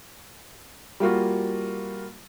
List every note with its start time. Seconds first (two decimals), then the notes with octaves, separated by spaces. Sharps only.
1.00 G3 A#3 F4 F#4